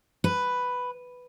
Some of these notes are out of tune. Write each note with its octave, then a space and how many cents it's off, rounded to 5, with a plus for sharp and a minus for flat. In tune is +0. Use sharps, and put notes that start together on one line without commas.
B4 +5